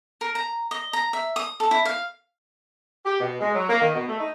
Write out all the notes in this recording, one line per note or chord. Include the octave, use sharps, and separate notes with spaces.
A#4
A#5
D#5
A#5
E5
D#6
A4
E4
F5
G4
B2
G#3
F#3
A#3
D#3
B2
A3
D#4